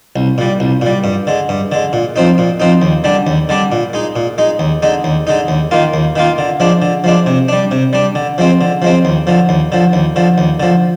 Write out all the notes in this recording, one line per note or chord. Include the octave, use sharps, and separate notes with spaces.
C2
A#2 G3
C2
A#2 G3
G2
D3 G#3
G2
D3 G#3
A#2
F3 C4 D#4
A#2
F3 C4 D#4
D#2
D3 G3 D4
D#2
D3 G3 D4
A#2
G#3 D#4
A#2
G#3 D#4
D#2
D3 G#3 D#4
D#2
D3 G#3 D#4
D#2
D#3 A#3 F4
D#2
D#3 A#3 F4
D3
F3 G#3 D4
D3
F3 G#3 D4
C3
G3 D4
C3
G3 D4
D3
F3 G#3 C4
D3
F3 G#3 C4
D#2
D3 F3
D#2
D3 F3
D#2
D3 F3
D#2
D3 F3